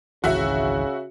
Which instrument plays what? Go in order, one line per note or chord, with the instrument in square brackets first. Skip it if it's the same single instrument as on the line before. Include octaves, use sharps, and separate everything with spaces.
[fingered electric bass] G#1 C#2 E3 [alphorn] C#3 [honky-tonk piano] F#4 E5